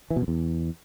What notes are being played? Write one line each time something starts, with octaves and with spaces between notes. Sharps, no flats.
E3
B2
F#2
E2